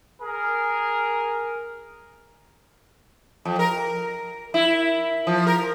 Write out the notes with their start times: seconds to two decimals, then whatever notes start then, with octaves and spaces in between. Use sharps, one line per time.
0.22 G#4 A#4
3.45 F2
3.59 A#4
4.54 E4
5.27 F3
5.47 A#4